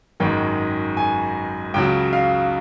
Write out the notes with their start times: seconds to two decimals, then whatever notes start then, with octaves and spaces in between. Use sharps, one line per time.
0.20 G#1 F#2 D#3 G#3 G5
0.97 G#5
1.74 C#2 C#3 F#3 G5
2.13 F5